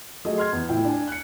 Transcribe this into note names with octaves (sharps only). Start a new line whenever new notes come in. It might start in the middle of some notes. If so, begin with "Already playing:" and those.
F#3 A3 G#4 D#5
C6 F6 G#6
E2
A2 E4 G5
D4 G#5
F#6 C#7